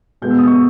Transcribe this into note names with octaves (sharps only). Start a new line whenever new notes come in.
B2 G#3 B3 G6
E6
D#6
C#6 E6